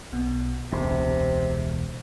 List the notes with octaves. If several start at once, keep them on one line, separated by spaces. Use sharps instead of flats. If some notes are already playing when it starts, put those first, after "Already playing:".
B1 B2
E1 C#2 C3